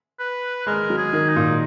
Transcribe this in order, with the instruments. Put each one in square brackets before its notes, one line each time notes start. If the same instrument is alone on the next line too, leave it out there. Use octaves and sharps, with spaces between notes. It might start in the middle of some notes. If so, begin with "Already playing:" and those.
[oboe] B4
[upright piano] G#3 [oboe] A#4
[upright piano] F#3
[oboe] G#4
[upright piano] D#3
[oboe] D#4
[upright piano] A#2